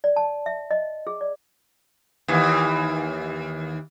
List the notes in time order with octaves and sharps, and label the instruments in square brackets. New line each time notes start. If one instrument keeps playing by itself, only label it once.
[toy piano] D5
A5
E5
D#5
G#4
D5
[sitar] D#2 E3